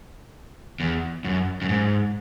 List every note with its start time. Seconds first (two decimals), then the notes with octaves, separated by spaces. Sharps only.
0.80 E2
1.24 F#2
1.62 F#2
1.69 G#2